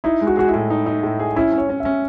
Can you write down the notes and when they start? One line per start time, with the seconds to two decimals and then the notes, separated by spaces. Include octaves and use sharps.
0.04 D#4 E4
0.21 G#3
0.27 F#4
0.37 F#4 G#4
0.48 E4
0.54 A2
0.70 D#4
0.86 D#4
1.03 A2
1.20 G#4
1.36 C#4 E4
1.52 C#4
1.58 C#5
1.69 C#4
1.80 E5
1.85 C#4